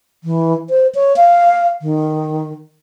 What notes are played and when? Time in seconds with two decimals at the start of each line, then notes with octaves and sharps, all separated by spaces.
0.24 E3
0.70 C5
0.95 C#5
1.16 F5
1.82 D#3